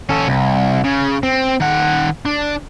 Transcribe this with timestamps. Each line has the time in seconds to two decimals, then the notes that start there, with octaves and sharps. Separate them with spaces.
0.09 C#4 A4
0.27 C2
0.84 C#3
1.23 C4
1.60 D#3 F#5
2.25 D4